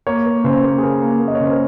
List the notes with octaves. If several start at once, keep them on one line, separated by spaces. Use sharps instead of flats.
A#3 C#5
A#3
C#3 C5
A#3
G#4
A#3 A#4
A#3
A#3
D#5
C#5
C#3 C5
A#4